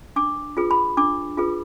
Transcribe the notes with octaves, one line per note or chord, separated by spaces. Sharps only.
D4 D6
F4 G#4 B4
B5
D4 D6
F4 G#4 B4